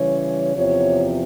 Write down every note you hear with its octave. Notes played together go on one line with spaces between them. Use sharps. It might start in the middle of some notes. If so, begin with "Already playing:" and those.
Already playing: C#3 E3 G3 C#5
E2 C3 F3 C#5